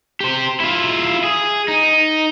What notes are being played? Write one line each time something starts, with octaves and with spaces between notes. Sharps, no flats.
G4 C5
E4 F4
G#4
D#4